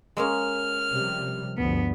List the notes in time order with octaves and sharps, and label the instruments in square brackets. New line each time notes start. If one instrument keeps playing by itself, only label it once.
[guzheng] G#3 A#3 C#4 [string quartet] F6
[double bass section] C3 F3 G3
[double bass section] G1 D2 F3 [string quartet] B3